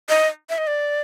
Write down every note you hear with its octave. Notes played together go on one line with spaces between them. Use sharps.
D#5
E5
D#5
D5